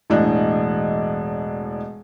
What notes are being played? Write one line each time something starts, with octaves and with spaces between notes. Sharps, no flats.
E1 A2 E3 D4 D#5